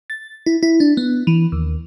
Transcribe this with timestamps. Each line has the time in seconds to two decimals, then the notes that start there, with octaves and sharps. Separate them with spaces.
0.10 A6
0.46 E4
0.63 E4
0.80 D4
0.97 B3
1.27 E3
1.52 D#2